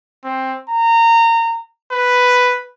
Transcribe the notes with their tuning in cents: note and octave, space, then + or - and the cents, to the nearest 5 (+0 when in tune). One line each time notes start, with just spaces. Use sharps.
C4 +10
A#5 -25
B4 +5